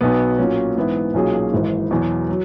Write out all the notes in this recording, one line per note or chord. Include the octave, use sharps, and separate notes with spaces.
B1 B2 F#3 B3
A#2 F#3 C#4
G#2 E3 B3 E4
B1 A#2 F#3 C#4 G#4
G#1 G#2 E3
E2 B2 F#3
F#3